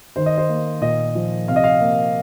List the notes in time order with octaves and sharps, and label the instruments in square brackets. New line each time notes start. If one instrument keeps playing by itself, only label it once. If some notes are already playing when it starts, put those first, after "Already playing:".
[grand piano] D#3 C5
D#5
C5
A#3
A#2 D#5
F3
C3 F5
D#5
F5
A#3